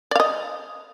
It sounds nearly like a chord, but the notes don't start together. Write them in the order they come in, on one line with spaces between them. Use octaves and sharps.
D5 F5 D#5